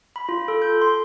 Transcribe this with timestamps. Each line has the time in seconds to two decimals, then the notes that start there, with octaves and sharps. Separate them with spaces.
0.16 B5
0.29 F4
0.48 A4
0.62 G6
0.82 C6